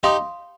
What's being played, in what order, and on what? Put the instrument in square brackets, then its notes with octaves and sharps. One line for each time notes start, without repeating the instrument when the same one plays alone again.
[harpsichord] D#4 G4 [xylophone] F5 C6 D#6